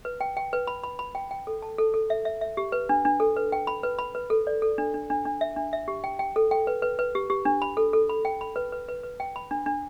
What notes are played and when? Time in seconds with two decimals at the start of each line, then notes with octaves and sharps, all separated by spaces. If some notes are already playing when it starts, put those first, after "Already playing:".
0.05 B4
0.21 G5
0.37 G5
0.53 B4
0.67 B5
0.84 B5
0.99 B5
1.15 G5
1.31 G5
1.47 A4
1.62 A5
1.78 A4
1.94 A4
2.10 E5
2.25 E5
2.41 E5
2.57 G4
2.72 B4
2.89 D4
3.05 D4
3.20 A4
3.37 B4
3.52 G5
3.67 B5
3.83 B4
3.99 B5
4.15 B4
4.30 A4
4.47 D5
4.62 A4
4.78 D4
4.94 D4
5.10 D4
5.25 D4
5.41 E5
5.56 D4
5.73 E5
5.88 G4
6.04 G5
6.19 G5
6.36 A4
6.51 G5
6.67 B4
6.82 B4
6.99 B4
7.15 G4
7.30 G4
7.45 D4
7.62 B5
7.77 A4
7.93 A4
8.09 B5
8.25 G5
8.41 B5
8.56 B4
8.72 B4
8.88 B4
9.03 B4
9.20 G5
9.36 B5
9.51 D4
9.66 D4